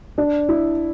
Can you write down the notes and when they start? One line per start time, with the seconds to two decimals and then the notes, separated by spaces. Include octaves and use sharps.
0.18 D4
0.49 E4